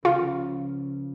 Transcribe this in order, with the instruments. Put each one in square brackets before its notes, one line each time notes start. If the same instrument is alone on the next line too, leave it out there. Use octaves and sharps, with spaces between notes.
[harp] C#2 C#3 F3 [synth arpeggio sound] F4